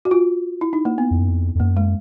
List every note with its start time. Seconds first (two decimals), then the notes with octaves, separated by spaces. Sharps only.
0.05 F#4
0.11 F4
0.61 E4
0.73 D#4
0.85 A#3
0.98 B3
1.11 F2
1.20 F#2
1.30 F2
1.55 F2
1.60 F#2 A#3
1.77 G#3